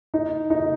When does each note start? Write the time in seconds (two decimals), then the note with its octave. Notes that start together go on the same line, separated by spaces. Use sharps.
0.14 D#4
0.50 D#4